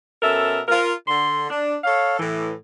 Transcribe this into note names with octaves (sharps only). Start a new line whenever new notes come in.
B2 C#4 A4 A#4 E5
F4 A#4
D3 C6
D4
A4 C#5 F5
A2 E3